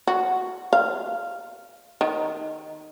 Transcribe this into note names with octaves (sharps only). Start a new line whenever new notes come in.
F#4
F5
D#3